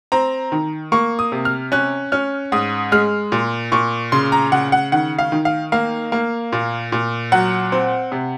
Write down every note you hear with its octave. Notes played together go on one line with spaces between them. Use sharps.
C4 A#5
D#3
A#3 C#6
D#6
C3
F6
C#4 F#6
C#4 F6
G#2 D#6
G#3 F6
A#2
A#2 C#6
C#3 C6
A#5
C#3 F#5
F#5
D#3 F#5
F5
D#3
F5
A#3 F5
A#3
A#2
A#2
F#3 F#5
C4
C3